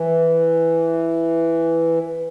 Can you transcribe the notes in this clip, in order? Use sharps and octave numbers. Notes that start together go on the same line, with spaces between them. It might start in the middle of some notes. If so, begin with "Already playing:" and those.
Already playing: E3